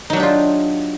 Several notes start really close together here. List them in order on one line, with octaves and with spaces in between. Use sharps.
D#4 F#3 D4 G4 F4